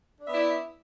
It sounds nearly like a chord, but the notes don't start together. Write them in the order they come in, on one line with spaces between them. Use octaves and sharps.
D4 E5 B3 E4 D5